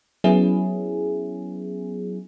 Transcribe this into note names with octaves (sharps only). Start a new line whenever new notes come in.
F#3 B3 C#4 E4 G#4